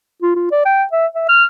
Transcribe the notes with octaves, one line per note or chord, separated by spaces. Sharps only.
F4
F4
D5
G5
E5
E5
F6